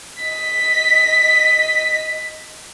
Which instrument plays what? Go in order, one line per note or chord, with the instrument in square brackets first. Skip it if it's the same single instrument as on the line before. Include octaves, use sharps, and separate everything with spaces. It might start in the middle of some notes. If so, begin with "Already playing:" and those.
[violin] D#5 B6